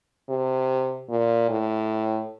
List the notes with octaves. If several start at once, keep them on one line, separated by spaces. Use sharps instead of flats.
C3
A#2
A2